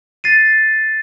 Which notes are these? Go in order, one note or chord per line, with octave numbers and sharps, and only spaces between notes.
A6 C7 D#7